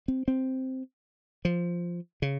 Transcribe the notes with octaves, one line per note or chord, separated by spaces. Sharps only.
C4
C4
F3
C#3